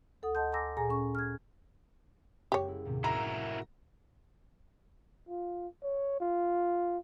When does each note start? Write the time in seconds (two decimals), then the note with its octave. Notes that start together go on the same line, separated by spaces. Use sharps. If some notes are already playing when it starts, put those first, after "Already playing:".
0.23 D2 A4 F#5 D#6
0.35 D#5 F#5 A5 C6 G6
0.52 G#5 A#5 C6 D6 E6 A#6
0.77 A#2 G#4 G#5 A#5 A#6
0.90 C#4 C#6
1.15 F6 G#6
2.52 F#1 G#3 G4 C#5
2.68 E4
2.85 D#2 A2 C3
3.04 E4 F#4 A#4 A#5 D6 C7 C#7
5.29 F4
5.83 C#5
6.20 F4